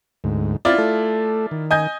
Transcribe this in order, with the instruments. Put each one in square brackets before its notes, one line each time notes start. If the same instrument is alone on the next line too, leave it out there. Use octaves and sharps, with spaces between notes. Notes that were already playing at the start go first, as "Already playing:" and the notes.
[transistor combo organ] D2 G#2
[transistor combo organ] C4 [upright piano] E4 F4 D5
[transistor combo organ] A3 A4
D#3
[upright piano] D#5 G#5 G6